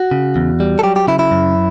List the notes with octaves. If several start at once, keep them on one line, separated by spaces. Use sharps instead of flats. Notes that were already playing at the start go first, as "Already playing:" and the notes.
Already playing: F#4
C#3
E2
G3
A4
F#3 G4
G4
C#3 E4
E4
F#2